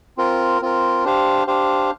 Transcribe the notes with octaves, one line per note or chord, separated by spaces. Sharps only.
C4 F4 A#4
C4 F4 A#4
D4 G4 C5 F5
D4 G4 C5 F5